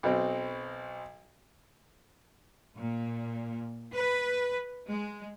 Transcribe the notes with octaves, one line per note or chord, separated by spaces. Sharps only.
B1 B2 C4
A#2
B4
G#3